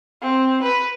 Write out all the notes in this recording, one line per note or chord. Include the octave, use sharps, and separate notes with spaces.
C4
B4